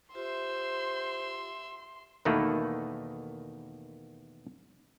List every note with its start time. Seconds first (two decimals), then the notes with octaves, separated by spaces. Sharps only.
0.15 F4 G4 C5 E5 C6
2.25 E2 B2 D#3 A3 A#3 B4